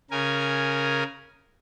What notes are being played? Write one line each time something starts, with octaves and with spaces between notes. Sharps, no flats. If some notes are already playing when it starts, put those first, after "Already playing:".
C#3 A#4 G#5